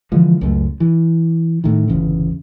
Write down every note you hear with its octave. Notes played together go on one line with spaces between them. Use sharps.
D3 E3 F3 G#3
C#2 F#2 A3
E3
A2 D#3
G1 E2 C#3